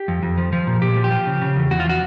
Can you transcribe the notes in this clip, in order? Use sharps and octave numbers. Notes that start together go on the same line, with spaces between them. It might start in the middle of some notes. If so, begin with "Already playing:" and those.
Already playing: G4
F2
F2
F3
F3
A#2
A#2 G4
F3
G4
F3
C#3
C#3
E2
E2 F#4
F4
F3 F#4